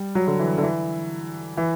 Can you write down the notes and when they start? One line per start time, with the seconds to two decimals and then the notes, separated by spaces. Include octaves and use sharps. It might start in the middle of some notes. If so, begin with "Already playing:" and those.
Already playing: G3
0.15 F#3
0.27 D3
0.39 E3
0.58 D3
0.63 E3
1.57 E3